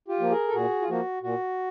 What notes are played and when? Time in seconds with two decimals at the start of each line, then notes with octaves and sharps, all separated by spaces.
0.08 F4 G4
0.19 F3 A#3
0.31 G#4 A#4
0.49 A4
0.54 A#2 F#4 G#4
0.82 F4
0.88 F3 A#3 F#4
1.23 A#2 F#4